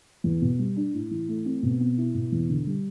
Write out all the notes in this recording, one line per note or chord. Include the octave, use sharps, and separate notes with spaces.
E2
B2
G3
D4
A2
E3
A3
C4
B2
B3
E4
B2
E2
D3
G3